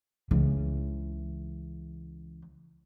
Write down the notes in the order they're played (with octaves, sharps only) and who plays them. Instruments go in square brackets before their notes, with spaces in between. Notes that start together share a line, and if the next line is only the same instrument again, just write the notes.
[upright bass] C#2 E3